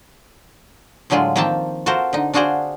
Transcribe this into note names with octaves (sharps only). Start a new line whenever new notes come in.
A2 D3 F#3 G#3 F4
D#3 F3 A#3 C4 G5 A5
F4 F#4 A4 A#4 C5
D3 D#4
D4 F4 F#4 G#4 C5 D5